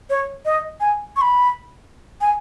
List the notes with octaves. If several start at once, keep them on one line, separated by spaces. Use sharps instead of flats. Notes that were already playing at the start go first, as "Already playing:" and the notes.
C#5
D#5
G#5
C#6
B5
G#5